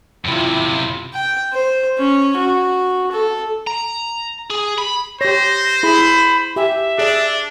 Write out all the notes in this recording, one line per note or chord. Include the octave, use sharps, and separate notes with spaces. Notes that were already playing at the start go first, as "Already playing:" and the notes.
F#2 C3 E4 F4
G5
C5
C#4
F#4
A4
A#5
G#4
B5
G4 C5 C#5 A#6
E4 G#4 B5
G4 E5 G#5
D4 G#4 D5